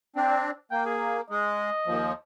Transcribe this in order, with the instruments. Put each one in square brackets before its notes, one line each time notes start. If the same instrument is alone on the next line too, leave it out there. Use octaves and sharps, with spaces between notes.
[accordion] C4 D4
[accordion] A#3 [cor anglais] G5
[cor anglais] G#4
[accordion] G#3 [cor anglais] D#5
[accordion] D#2 F3